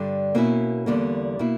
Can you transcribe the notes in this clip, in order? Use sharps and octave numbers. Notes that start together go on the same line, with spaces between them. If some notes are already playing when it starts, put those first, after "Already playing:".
Already playing: G2 D3 G3
B2 A#3 C#4 E4
E2 D3 G3 A#3
B2 A#3 E4